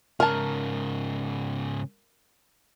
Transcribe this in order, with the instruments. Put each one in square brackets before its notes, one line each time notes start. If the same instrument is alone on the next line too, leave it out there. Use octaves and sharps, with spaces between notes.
[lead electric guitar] G#2 C#3 [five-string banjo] A#4 A5